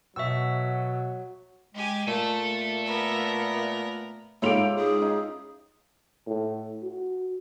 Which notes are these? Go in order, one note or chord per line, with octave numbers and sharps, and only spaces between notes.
B2 F#3 E5 C#6 E6
G#3 G4 G#5
A#2 A3 A4 E5 A5
B3 A#4
G#2 E4 F4 G4 A4 C#5 D7 F7
G#4
C#4 D#4 F5
A2
F#4